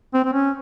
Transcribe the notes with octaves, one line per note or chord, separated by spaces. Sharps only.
C4
C4
C#4